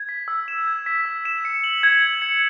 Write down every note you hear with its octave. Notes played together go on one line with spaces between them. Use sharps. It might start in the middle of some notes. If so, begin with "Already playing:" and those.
Already playing: G#6
B6
E6
E7
G#6
B6
E6
E7
C#7
F#7
G#6
G#6
C#7